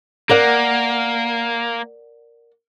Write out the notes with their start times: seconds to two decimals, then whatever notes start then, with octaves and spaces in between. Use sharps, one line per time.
0.29 A#3 A#4 D5 F#5